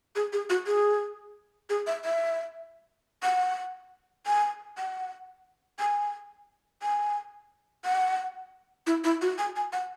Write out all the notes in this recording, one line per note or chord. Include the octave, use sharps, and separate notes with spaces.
G#4
G#4
F#4
G#4
G#4
E5
E5
F#5
G#5
F#5
G#5
G#5
F#5
E4
E4
F#4
G#5
G#5
F#5